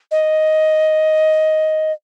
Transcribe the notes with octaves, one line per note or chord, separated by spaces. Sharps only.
D#5